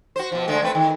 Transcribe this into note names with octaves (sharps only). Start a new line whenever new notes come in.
F#4 C5
B2 F3
D3 G#3 A3
A3 C4 B4
D#3